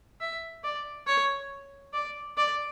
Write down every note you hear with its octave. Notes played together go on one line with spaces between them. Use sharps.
E5
D5
C#5
D5
D5